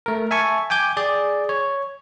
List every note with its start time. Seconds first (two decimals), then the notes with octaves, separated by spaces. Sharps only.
0.06 A3 A#4
0.31 E5 G#5 A5 C#6
0.70 G5 G#5 D6 G6
0.97 G#4 D5
1.49 C#5